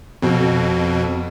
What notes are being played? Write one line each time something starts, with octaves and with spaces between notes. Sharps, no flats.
F2 B2